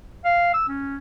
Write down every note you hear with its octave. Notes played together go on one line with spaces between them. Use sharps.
F5
E6
C#4